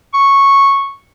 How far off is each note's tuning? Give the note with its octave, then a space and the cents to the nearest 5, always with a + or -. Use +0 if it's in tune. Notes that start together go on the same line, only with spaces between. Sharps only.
C#6 -5